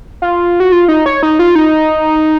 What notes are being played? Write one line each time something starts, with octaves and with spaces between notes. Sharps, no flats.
F4
F#4
F4
D#4
C#5
D#4
F4
D#4